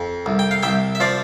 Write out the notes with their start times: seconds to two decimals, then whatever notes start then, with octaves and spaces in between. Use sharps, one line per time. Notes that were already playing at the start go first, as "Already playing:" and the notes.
Already playing: F2
0.26 C2
0.39 G5
0.51 F5
0.63 C2 E5 G5
0.95 E5
1.00 F3 D5 F5